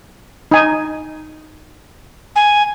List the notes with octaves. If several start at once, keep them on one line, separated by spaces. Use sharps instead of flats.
D#4 G#5
G#5